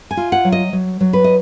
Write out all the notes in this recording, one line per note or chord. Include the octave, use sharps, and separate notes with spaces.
G#5
F4
F#5
F#3
D#5
F#3
F#3
B4
D#5